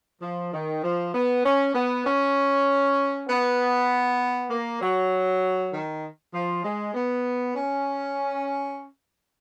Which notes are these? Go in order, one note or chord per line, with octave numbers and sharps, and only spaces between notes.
F3
D#3
F3
B3
C#4
B3
C#4
B3
A#3
F#3
D#3
F3
G#3
B3
C#4